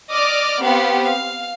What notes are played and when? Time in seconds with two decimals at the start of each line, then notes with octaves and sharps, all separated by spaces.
0.11 D5 D#5 D6 F6
0.62 B3 C4 G4 C5 F5 F#5
1.03 F5